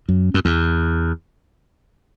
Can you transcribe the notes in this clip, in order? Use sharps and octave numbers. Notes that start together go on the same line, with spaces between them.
F#2
F#2
E2